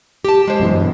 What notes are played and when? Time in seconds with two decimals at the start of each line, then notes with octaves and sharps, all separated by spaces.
0.24 G4 A5
0.47 G#3 C5
0.60 F#2 B2 E3
0.72 G2